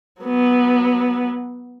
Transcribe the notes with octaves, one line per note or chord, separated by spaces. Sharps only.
F#3 B3